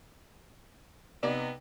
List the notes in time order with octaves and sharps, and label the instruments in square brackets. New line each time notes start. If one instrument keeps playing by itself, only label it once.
[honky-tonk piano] C3 D#4 [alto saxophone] B3 [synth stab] D5